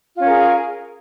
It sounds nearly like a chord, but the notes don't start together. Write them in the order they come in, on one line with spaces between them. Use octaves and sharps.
F4 C#4 A#4 G#4